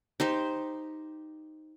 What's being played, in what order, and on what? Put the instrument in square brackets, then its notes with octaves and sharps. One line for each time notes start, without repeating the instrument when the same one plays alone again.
[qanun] D#4 G4 C5